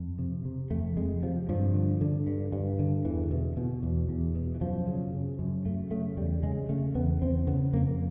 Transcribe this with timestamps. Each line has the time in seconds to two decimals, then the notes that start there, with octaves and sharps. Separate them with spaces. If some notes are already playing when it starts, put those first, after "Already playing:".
Already playing: F2
0.19 C3
0.45 C3
0.71 F2 A3
0.97 F2 G#3
1.23 C3 F3
1.49 G2 F3
1.75 D3
2.01 D3
2.27 G2
2.52 G2
2.79 D3
3.05 E2 E3
3.31 B2
3.57 B2
3.83 E2
4.09 E2
4.35 B2
4.55 E3
4.61 F#2 F3
4.87 C#3
5.13 C#3
5.39 F#2
5.65 F#2 A3
5.91 C#3 A3
6.17 E2 G3
6.43 C#3 G#3
6.69 C#3 A3
6.95 E2 B3
7.22 E2 C4
7.47 C#3 B3
7.73 F2 A#3